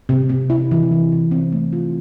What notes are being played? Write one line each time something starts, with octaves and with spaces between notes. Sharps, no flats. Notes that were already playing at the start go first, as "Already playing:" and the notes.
C3
C3
E4
E3
E3
C3
C4
A3
F4